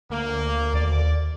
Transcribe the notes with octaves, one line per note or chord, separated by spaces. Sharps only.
D2 A#3
D#2 D5